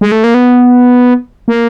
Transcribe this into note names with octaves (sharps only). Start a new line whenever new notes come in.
G#3
A3
A#3
B3
A#3